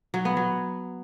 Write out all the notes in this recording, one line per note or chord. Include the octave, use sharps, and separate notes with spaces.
F#3
B3
F#3